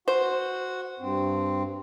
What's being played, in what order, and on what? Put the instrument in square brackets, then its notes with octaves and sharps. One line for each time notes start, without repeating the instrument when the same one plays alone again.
[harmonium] F#4 F#5 [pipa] C5
[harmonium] G2 C4